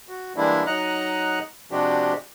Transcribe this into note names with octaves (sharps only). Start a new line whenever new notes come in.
F#4
E3 G3 G#3 A#3 D4 E4
F#3 D#4 D#5 F#5 A#5 F#6
C3 F3 G#3 D4 F#4 G4